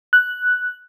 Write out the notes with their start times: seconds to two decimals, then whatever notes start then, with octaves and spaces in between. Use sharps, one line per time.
0.13 F#6